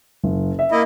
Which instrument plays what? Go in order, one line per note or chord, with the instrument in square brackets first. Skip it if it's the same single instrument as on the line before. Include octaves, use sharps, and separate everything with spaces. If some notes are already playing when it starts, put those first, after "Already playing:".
[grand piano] F#1
E5
[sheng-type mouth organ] A#3 E4 D#5